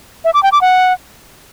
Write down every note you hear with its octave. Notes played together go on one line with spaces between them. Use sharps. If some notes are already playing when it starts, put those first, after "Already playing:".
E5
D6
G5
D6
F#5